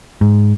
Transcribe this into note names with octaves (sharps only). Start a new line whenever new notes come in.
G#2